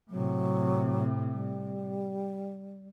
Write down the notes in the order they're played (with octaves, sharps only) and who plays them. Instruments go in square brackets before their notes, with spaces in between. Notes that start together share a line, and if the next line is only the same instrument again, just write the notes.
[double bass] A2 C3 [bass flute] F#3
[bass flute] G3